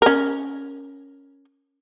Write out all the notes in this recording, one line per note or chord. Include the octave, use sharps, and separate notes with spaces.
C#4 A#4